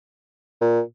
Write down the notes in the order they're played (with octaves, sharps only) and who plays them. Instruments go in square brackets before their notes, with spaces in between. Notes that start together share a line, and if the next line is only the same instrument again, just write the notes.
[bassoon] A#2